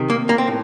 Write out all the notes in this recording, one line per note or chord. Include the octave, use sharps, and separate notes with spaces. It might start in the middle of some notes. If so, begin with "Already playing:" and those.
Already playing: C3 D#3
A#3
A#3
C4
A2